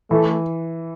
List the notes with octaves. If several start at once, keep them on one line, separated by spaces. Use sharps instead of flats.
E3 A3